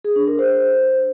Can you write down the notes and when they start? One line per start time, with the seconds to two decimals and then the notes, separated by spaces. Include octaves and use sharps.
0.04 G#4
0.16 D4
0.27 A#4
0.39 C5